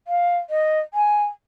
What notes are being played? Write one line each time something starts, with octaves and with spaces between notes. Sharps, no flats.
F5
D#5
G#5